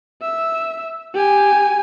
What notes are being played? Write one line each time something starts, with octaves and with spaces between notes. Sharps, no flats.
E5
G4 G#5